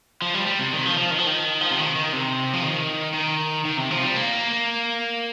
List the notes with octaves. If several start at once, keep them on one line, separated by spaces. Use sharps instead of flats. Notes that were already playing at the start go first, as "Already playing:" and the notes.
F3
G3
G3
C3
D#3
F3
F3
D#3
F3
D#3
F3
C3
D#3
D#3
C3
F3
D#3
D#3
D#3
C3
F3
G3
A#3